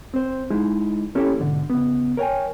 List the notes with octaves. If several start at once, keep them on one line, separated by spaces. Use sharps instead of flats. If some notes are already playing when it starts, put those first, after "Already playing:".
C4 C5
G#3 D#4 E4
A#3 C#4 E4 G4 A4 C#5
G#2 B2 D3
C#3 B3
A#4 C#5 G5 G#5